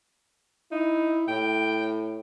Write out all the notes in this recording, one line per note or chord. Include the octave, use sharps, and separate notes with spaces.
D#4 E4
A2 G5